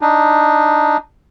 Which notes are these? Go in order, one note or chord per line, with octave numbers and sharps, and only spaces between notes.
D4 D#4